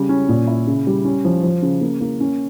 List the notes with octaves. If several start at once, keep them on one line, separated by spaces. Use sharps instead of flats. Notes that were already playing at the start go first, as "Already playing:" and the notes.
Already playing: C#3 G3
C#4
A#2
E4
C#3
G3
C#4
F3
F3
C#3
A#3
A#3
C#4